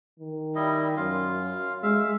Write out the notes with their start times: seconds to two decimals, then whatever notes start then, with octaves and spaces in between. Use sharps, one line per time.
0.19 D#3
0.56 G3 E4 D#5
0.97 F#2 F4 F5
1.83 G#3 E5 F5